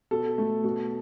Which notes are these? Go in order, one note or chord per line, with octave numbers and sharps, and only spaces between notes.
B2 A4
A3
B2